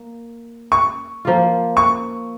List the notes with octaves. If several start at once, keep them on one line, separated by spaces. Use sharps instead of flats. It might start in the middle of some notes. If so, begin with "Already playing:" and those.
Already playing: A#3
C#6
F3 A#3 F4
C#6